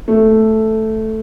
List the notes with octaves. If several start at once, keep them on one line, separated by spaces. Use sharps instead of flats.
A3